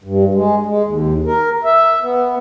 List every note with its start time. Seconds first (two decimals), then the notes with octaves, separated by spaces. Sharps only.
0.04 G2
0.35 G#3
0.66 G#3
0.85 D#2
1.26 A#4
1.64 E5
2.02 B3